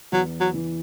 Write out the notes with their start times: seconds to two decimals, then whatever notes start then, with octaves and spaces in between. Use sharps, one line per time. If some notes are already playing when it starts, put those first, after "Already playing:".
0.12 E2 F#3
0.40 F#3
0.54 E3